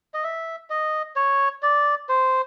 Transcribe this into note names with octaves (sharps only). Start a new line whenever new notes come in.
D#5
E5
D#5
C#5
D5
C5